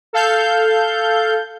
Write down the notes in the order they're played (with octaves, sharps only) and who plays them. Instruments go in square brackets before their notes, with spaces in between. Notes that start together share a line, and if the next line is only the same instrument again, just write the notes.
[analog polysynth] A4 F5 G6